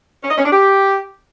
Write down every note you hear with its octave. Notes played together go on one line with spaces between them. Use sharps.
C#4
D#5
C#4
D4
G4